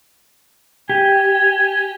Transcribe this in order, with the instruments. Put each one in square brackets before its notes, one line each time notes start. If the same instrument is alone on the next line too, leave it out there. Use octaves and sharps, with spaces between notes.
[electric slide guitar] G4 [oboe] G#5